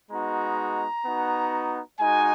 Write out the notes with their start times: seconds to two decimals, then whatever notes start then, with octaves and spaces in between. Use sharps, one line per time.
0.11 G#3 B3 D#4 F#4 A#5
1.05 B3 D#4 F#4
2.00 G#3 D#4 F#4 G#5